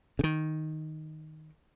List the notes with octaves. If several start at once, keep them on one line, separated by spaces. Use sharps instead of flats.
C#3
D#3